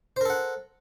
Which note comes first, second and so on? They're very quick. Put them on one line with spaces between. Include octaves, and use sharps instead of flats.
C5 A#4 A4 F#5